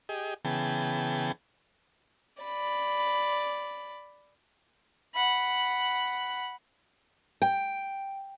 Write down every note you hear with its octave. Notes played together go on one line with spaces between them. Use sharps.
G4 G#4 D#5
C#3 E3 B3 G#4 G5 A5
D5 B5
F#5 B5
G5